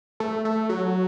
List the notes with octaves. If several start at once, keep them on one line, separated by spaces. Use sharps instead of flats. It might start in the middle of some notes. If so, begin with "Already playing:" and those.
A3
A3
F#3